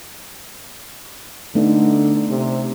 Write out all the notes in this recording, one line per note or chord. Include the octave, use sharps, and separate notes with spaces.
D3 A3 B3 D#4
C3